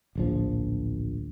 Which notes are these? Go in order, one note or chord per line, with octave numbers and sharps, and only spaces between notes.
D1 A#1 F3